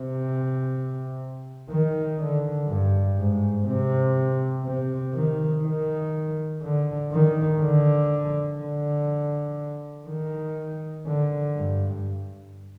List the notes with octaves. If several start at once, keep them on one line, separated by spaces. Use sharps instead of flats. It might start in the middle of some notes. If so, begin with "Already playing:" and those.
Already playing: C3
D#3
D3
G2
G#2
C3
C3
D#3
D#3
D3
D#3
D3
D3
D#3
D3
G2